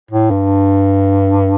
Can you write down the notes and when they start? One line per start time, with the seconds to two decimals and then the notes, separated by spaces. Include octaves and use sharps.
0.11 A2
0.31 G2